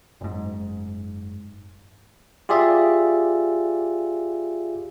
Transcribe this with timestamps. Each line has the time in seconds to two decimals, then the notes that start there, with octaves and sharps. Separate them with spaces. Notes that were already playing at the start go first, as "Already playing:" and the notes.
0.21 F#1 G#2
2.49 F4 G4 G#4 D5 E5